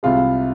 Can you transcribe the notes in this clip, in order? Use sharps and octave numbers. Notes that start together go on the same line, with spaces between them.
C2 C3 G#3 F4